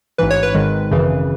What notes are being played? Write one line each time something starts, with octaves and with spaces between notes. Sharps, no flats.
A1 G#2 E3 B4
C#5
B4
G#1 G#2 D#3 G#3
G#1 F#2 C#3 E3